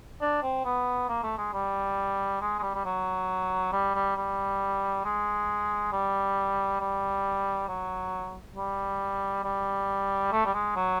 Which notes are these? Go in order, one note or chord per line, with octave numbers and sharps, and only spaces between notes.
D4
C4
B3
A#3
A3
G#3
G3
G#3
G#3
G3
G3
F#3
G3
G3
G3
G#3
G3
G3
F#3
G3
G3
A3
G3
G#3
F#3